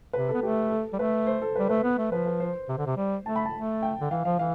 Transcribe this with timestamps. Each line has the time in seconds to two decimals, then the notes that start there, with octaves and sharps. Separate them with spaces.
0.13 C3 B4
0.28 A4
0.34 B3
0.42 A3 G4
0.70 A4
0.93 G3
0.99 A3 B4
1.27 C5
1.42 A4
1.56 G3 B4
1.69 A3 B4
1.84 B3
1.98 A3
2.12 F3 B4
2.26 B4
2.40 C5
2.68 C3
2.78 D3
2.86 C3
2.97 G3
3.25 A3 A5
3.36 B5
3.46 A5
3.53 A3
3.82 G5
4.01 D3
4.10 E3 F5
4.25 F3 F5
4.39 E3 F5